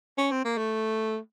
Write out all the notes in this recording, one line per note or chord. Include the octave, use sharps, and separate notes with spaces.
C#4
C4
A#3
A3